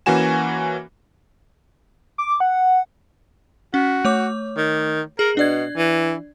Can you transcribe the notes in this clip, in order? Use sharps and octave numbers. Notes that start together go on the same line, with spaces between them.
E3 A#3 C#4 F#4 G#5 E7
D6
F#5
C#4 F#4
A3 C#5 D6
D#3
G#4 A#4
B2 D4 D5 G#6
E3